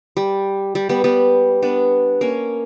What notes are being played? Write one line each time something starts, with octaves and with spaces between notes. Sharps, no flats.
G3
G3
G3 B3
G3 B3
B3 D4
A#3 C#4